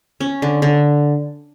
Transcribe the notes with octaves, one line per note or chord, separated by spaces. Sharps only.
C#4
D3
D3